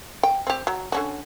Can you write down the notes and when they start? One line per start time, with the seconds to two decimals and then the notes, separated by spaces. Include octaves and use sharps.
0.23 G5
0.47 C4 G4
0.67 F#3
0.92 D3 C#4 F#4